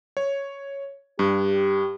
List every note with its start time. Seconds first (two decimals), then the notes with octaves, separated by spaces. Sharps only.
0.17 C#5
1.19 G2 G4